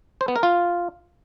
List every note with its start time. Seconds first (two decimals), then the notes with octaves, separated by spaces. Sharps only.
0.21 C5
0.28 B3
0.36 A#4
0.43 F4